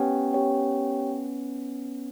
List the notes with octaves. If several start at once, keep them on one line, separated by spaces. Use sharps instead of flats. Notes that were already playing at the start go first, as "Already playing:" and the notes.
Already playing: B3 C#4 G4 C#5 G5
G4 C#5 G5